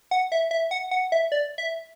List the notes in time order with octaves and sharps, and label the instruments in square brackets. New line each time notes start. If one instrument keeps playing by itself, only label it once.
[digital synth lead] F#5
E5
E5
F#5
F#5
E5
D5
E5